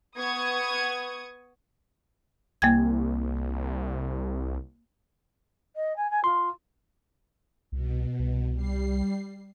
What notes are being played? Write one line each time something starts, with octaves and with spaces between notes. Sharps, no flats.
B3 C#6 D#6 G#6
C2 A#3 G5 G#6
D#5
G#5
G#5
F4 C6
C2 B2
C2
G3 C7